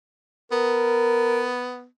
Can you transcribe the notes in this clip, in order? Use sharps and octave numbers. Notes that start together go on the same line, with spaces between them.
B3 A#4